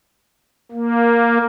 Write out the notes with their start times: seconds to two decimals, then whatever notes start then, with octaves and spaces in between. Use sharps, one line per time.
0.72 A#3